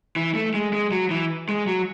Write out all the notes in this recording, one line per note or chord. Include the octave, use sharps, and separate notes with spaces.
E3
A3
G#3
G#3
F#3
E3
G#3
F#3